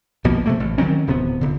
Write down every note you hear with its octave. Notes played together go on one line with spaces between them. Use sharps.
B1 B2 F3 A#3
C3 A3 A#3
A1
D#3 F#3 C4 C#4
D1 C3 B3
D#1 D3